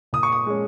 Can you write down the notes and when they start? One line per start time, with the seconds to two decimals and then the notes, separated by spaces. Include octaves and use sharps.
0.13 A#2 D#6
0.23 C#6
0.32 D#6
0.46 G#3 C#4